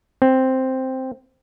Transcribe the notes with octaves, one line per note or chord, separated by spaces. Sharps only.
C4